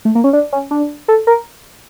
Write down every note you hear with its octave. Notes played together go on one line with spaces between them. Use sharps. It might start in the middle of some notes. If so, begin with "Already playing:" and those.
A3
A#3
C#4
D4
C#4
D4
A4
A#4